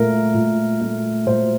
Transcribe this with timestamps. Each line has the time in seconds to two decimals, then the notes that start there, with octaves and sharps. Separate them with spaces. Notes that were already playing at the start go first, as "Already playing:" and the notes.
Already playing: A#2 A3 A#4
0.34 A#2
0.81 A3
1.26 A#2 C5